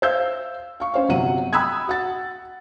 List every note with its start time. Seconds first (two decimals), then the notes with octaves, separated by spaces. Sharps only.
0.02 C5 E5 F5 E6 G6
0.80 F5 C#6
0.94 C#4 C5 F5
1.09 G1 C3 F#3 F#5 D#7
1.53 G5 B5 D#6 E6 F#6 G#6
1.87 F#4 F#5 A6